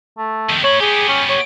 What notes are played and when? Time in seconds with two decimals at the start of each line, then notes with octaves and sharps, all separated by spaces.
0.18 A3
0.49 F2 D#3
0.64 A3 C#5 B5
0.81 B3 G4 G#4
1.08 C#4
1.29 C#5